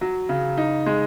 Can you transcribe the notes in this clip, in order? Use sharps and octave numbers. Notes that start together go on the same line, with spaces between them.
F#3
C#3
D#4
G#3